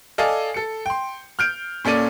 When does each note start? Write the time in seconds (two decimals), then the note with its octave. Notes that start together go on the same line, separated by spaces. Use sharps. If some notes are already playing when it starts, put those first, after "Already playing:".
0.18 A4 D5 D#5 F5 G#5
0.54 A4 C#7
0.86 G5 C6
1.39 F6 G6 D7
1.85 A#2 C#4 A4 D5 D#7